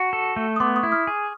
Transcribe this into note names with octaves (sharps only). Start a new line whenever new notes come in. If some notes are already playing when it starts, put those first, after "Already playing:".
Already playing: F#4 A5
A4
A3
D#6
B3 C6 D6
C#6 D#6
E4
D#6 F6
G#4